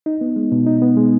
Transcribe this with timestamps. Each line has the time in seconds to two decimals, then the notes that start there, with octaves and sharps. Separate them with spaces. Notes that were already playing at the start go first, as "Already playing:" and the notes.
0.06 D#4
0.21 B3
0.36 G#3
0.52 B2
0.67 D#4
0.82 B3
0.97 G#3